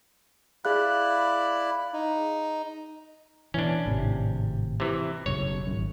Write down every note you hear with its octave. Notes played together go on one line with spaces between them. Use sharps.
E4 G#4 D5 F5 B5 F#6
D#4
B2 E3 C#4 D4
G#1 A2 C3
C3 E3
F#1 B1 C#3 C#5
G#1 F#2